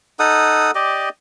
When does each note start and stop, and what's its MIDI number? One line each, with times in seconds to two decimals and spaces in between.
0.19 0.71 63
0.19 0.71 69
0.19 0.71 78
0.19 0.71 87
0.75 1.09 67
0.75 1.09 74
0.75 1.09 75